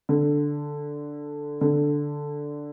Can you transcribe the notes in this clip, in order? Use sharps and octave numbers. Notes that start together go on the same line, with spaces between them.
D3
D3